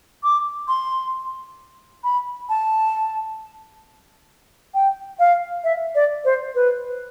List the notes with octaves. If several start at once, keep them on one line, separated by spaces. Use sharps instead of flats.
D6
C6
B5
A5
G5
F5
E5
D5
C5
B4